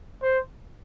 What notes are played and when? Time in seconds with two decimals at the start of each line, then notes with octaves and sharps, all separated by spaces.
0.22 C5